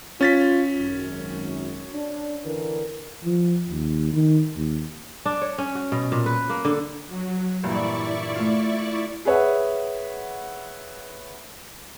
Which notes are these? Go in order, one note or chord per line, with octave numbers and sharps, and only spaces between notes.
C#4 F4 A6 B6
G#1 F#2
D4
D3 E3 A#4
F3
D#2
D#3
D#2
D4
C#5
C#4
F#4
B2
A#2
B4
A#3
D3
F#3
G2 A#2 E3 E4 D5 C#6
A3 F4
G#4 B4 C#5 E5 F#5